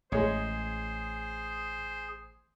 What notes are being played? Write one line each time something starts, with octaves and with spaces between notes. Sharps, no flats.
A1 G#3 G#4 C5 C#5